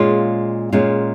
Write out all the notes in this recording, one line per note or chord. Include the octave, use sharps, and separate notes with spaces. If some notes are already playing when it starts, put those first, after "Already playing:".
Already playing: A#2 G#3 C#4 F4
A#2 G#3 C#4 F4